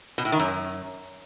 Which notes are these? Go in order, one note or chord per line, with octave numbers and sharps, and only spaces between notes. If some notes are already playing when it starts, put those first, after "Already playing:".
B2
A2
D#3
F#2